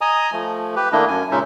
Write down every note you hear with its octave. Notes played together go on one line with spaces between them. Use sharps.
D#5 G#5 A#5 D#6
F3 A3
G4 B4
D#3 A3 A#3 D4 E4 D#5
F#2 G#5
A#2 C#3 G#3 C#4 D#4 E5